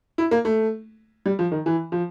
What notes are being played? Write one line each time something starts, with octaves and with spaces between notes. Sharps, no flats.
E4
A#3
A3
G3
F3
D#3
E3
F3